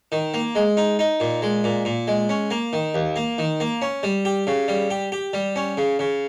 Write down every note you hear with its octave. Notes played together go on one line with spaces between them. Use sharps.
D#3
A#3
G#3
D#4
D#4
A#2
G#3
A#2
A#2
G#3
C#4
A#3
D#3
D#2
A#3
D#3
A#3
C#4
G3
G4
C#3
G3
G4
G4
G3
C#4
C#3
C#3